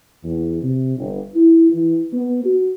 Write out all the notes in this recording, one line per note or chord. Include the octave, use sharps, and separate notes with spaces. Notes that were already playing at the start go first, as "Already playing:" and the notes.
E2
C3
G1
E4
E3
B3
F#4